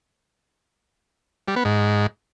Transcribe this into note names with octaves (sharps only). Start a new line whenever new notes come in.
G3
B3
G#2